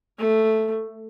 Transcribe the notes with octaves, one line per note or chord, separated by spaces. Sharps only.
A3